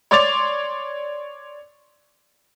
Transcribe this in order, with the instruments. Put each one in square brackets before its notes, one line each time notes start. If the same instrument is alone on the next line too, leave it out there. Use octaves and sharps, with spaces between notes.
[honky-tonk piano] C#5 D5 C6 D6 A6 F7